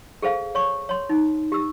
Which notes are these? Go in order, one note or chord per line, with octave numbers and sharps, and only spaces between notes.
G#4 A4 C5 F5
C#5 C#6
C#5 C6
D#4
G4 E6